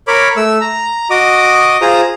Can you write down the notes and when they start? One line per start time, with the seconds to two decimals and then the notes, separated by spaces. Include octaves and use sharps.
0.08 A#4 C#5 B5 D6
0.37 A3 E6
0.61 A#5
1.10 F#4 D#5 D6 D#6
1.81 F4 G#4 C5 A#5 D#6